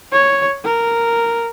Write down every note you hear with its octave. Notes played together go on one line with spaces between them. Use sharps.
C#5
A#4